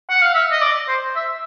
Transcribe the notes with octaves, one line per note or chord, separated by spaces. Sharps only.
F#5
F5
E5
D#5
D5
C5
E5